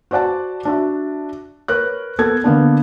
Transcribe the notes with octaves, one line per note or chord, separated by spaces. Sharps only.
F#4 C5 D5 F#5 A5
D4 F#4 E5
A#4 B4 C#5 F#6
B3 A4 A#4 G#6
D3 A#3 B3 D4